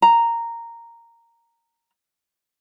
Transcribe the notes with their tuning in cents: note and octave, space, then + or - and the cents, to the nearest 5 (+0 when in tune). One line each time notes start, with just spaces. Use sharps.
A#5 -5